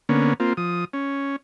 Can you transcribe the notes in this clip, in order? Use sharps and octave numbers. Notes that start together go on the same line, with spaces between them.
D3 A#3 B3 C#4
A#3 C4 F4
F3 D#6
C#4